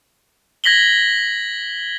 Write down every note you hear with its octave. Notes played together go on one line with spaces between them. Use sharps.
G#6 A#6 B6 F#7 G7